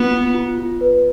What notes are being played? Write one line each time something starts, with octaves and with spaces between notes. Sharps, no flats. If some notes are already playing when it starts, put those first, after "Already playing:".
Already playing: B3 F4
F4
F4
F4
B4